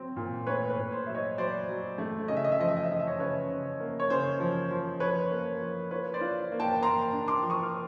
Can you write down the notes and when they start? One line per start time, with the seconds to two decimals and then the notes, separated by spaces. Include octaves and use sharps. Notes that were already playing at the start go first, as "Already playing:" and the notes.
Already playing: F#3 C4
0.17 A#2
0.47 A3 B4 C#5
0.70 B4
0.77 A#2
0.92 C5
1.06 F#3 E5
1.15 C#5 D#5
1.38 F#3 C5 D5
1.69 F#3
1.98 A3
2.28 C#3 D#5
2.37 E5
2.44 D#5
2.52 E5
2.59 F3 D#5
2.68 E5
2.77 D#5
2.84 E5
2.89 C#3 D#5
3.00 E5
3.07 C#5 D#5
3.19 C#3 B4 C#5
3.49 C#3
3.80 A#3
4.00 C#5
4.10 C#3 C5
4.40 F3
4.71 F3
5.00 F3 B4 C#5
5.31 A#3
5.62 F3
5.91 F4 B4 C#5
6.14 C5 D5
6.21 F4
6.52 A#3
6.60 G5 A5
6.82 A#3 A#5 C6
7.13 D4
7.28 C6 D6
7.43 F3
7.50 C#6 D#6
7.63 F6